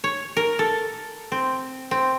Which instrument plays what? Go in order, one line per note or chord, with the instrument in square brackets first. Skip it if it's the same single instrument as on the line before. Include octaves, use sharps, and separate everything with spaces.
[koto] C#5
A#4
A4
C4
C4